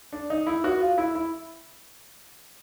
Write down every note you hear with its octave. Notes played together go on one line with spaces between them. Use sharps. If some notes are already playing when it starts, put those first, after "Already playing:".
D4
D#4
E4
F#4
F4
E4
E4